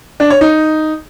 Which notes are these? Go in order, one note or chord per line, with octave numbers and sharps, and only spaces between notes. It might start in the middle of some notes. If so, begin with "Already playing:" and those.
D4
C#5
D#4